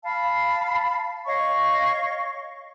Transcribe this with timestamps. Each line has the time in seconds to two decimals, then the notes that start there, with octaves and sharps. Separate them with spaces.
0.04 F5 A5 B5
1.26 C#5 D#5 F5 C#6